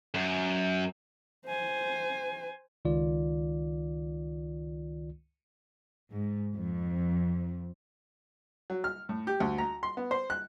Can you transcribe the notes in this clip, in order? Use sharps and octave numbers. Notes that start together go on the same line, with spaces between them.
F#2
C5 G#5
C#2 D#3 F4 D5
G#2
F2
F#3
F6
A2
G4
D2
A#5
C6
B3
C5
F#6